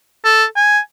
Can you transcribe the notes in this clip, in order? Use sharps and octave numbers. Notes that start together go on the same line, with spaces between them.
A4
G#5